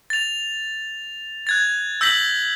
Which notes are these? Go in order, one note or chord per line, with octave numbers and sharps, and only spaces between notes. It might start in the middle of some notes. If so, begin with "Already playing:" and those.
A6 F7
F#6 G#6 A6
E6 G6 A#6 B6 F#7